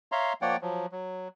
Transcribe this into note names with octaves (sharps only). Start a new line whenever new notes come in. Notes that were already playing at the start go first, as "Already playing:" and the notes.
C#5 E5 F5 A#5 C6
F3 A#3 C#5 D5 F#5 G5
F3 F#3
F#3